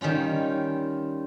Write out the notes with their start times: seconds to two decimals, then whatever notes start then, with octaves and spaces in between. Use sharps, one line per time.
0.01 D#3 G3 C#4 F4